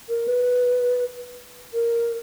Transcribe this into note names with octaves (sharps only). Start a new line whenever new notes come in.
A#4
B4
A#4